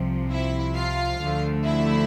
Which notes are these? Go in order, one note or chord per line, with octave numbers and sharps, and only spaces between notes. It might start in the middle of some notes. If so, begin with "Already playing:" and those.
Already playing: C2 C3 F3
E4 E5
F4 F5
D2 D3 F3 A3
E4 E5